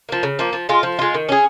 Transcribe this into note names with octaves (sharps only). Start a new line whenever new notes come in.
F3 A#3
C#3
F3 A#3
F3
G#3 F4
F3
G#3 F4
D#3
C#4 G#4